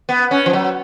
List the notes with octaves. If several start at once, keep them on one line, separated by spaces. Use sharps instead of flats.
B3
C#4
F3
F#3